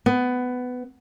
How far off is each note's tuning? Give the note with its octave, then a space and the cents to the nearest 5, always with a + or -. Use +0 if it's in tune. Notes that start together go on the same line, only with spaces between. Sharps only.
B3 +15